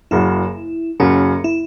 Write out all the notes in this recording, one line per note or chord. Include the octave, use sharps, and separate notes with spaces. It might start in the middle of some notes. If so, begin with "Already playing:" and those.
F#1 F#2 C#3 F#3 E4
F#1 F#2 C#3 F#3 C#4
E4